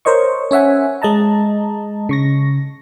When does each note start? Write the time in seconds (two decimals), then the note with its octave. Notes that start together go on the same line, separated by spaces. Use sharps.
0.05 A#4 C5 C#5 D#5 C#6
0.51 C#4 C#5 E5 F#5 G#5
1.02 G#3 D#5 A5 A#5
2.09 C#3 C#6 A#6